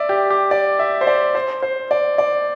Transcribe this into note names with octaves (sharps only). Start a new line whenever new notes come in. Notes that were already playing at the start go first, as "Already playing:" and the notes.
Already playing: D5 E5
G4
G4
D5
E5
C5
D5
C5
C5
D5
D5